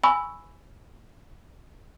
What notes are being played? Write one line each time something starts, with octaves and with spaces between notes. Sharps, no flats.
G#5 B5 C#6 E6